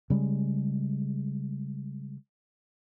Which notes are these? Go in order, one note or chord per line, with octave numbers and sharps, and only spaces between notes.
C#3 G3 G#3